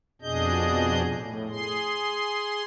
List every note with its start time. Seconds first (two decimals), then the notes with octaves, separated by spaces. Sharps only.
0.22 F2 B2 D4 G#4 D#5 G6
1.08 A2
1.49 G#4 C6